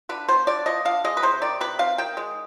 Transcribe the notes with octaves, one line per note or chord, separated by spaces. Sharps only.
D3 B4
B3 C5
D3 D5
F3 D#5
D3 F5
G#3 D#5
B4
C3 C5
D#3 D5
C3 B4
C4 F5
D#3 G5
G#3